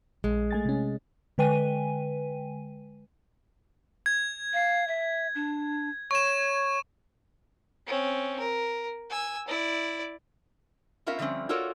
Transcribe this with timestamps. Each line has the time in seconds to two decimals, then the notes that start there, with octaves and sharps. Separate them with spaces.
0.24 A#1 G#3
0.51 A3 G#5 A6
0.65 C3 C#4
1.38 D3 G#3 B4 G5 G#5 D#7
4.06 G#6
4.53 F5
4.88 E5
5.35 D4
6.11 C#5 C#6 E7
7.87 C4 C#4
8.39 A#4
9.10 G#5 E6
9.48 E4 D5
11.06 B3 C#4 F4 A#4 E5 F5
11.19 D3 F3 G3 A#3 C4 C#4
11.49 F4 F#4 A4 A#4 C#5 D5